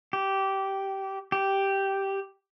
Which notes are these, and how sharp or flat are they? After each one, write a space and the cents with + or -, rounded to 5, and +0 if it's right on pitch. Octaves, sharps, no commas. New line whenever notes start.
G4 -15
G4 -5